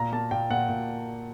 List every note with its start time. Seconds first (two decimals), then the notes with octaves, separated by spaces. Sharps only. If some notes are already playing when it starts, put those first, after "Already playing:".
Already playing: A#2 A#5
0.12 A#3 A5
0.31 A#2 G5
0.50 A#2 F#5
0.69 A#2